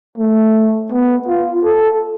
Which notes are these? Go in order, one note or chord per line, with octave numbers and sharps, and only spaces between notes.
A3
B3
F4
A4